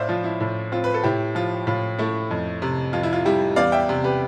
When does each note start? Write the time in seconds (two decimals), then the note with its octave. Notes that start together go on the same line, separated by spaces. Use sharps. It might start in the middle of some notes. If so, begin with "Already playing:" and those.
Already playing: A2 C5 D5 E5 F5
0.09 F3 F4
0.24 E4
0.40 A2
0.72 C4 F4
0.84 B4
0.94 A4
1.03 A2 E4 G4
1.35 F3 F4
1.67 A2 F4
1.99 A3 E4
2.31 F2
2.62 C3
2.93 F2 F4
3.03 E4
3.13 F4
3.25 G3 E4 G4
3.56 E2 D5 F5
3.72 E5 G5
3.89 C3
4.04 G4 B4